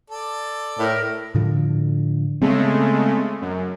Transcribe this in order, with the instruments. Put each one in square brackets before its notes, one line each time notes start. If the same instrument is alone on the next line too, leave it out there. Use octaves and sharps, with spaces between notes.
[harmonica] A4 D5
[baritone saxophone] A2 [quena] A#4
[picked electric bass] A2 D3 F3
[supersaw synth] C#3 G#3 A3 [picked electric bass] B3 C4
[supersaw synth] F#2